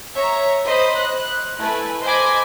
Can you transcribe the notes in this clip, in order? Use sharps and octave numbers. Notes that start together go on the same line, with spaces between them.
C#5 E5 A#5
C5 D#5 B5 D#6
F#6
A3 E4 B4 G#5
C5 D#5 G#5 B5 D6